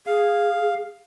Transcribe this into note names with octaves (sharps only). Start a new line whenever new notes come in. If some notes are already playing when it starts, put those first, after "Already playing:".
G#4 F5